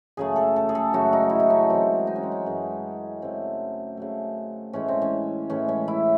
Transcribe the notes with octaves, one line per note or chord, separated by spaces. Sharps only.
F#2 C#3 F#3 A3 G#4
A4
A4
G#4
A4
F#2 C#3 F#3 A3 F#4
D#4
E4
D#4
C#4
F#2 E3 G#3 C4
D#4
C#4
C4
C#4
F#2 E3 G#3
C#3 F#3 A3 C4
C#3 F#3 A3
A2 E3 G#3 C#4
C4
C#4
A2 E3 G#3 C#4
C#4
E4